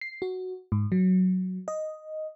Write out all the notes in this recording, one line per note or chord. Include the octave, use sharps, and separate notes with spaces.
C7
F#4
G#2
F#3
D#5